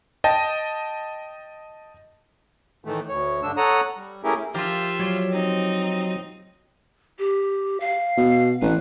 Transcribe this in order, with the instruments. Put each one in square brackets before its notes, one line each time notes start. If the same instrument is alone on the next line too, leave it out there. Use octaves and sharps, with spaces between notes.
[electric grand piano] D#5 G5 A5
[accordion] A2 D#3 E3 A3
D2 C#5
G2 D3 D4 E6
A4 C#5 F#5 A#5 D#6
G3
A3 C#4 E4 G4 G#4 A#4
[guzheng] F3 G4 A#4 [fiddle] F4 E5
[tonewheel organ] F#3 [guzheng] C#5 D5 C6
[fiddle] C4 D#4
[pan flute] G4
F5
[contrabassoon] B2
[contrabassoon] A1 [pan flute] B4